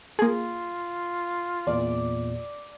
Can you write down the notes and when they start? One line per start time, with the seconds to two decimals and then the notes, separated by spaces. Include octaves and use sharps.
0.19 A#3 F4 G#4
1.67 E2 A#2 D5